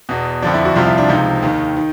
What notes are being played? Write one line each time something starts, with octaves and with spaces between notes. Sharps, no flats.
E2 B2
F2 D3 F3 D4
E4
F#4
C2 C3 F3 F4
E4
D4
C#2 C3 F3 D#4
D#2 D#3
D#3